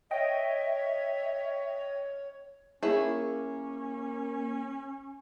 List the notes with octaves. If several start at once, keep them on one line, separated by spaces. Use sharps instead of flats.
C#5 D#5 E5 G5
A#3 C#4 E4 G#4 C#5